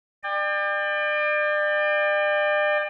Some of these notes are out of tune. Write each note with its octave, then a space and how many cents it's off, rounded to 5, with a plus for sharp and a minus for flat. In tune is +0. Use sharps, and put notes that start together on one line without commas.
D5 +35 G5 +35